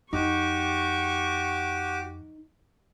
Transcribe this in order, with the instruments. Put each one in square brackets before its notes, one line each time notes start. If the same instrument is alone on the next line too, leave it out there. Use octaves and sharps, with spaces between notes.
[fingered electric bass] F2 [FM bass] D#4 [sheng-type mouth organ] F#4 G4 D6 [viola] C#6